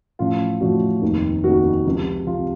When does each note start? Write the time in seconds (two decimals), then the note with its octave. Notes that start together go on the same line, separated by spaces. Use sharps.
0.19 A1 A2 F3 F4
0.61 A1 A2 F3 F#4
1.02 F1 D#2 D#3
1.43 F1 D#2 D#3 F#4
1.85 C#2 C3 F3
2.27 C3 F3 F4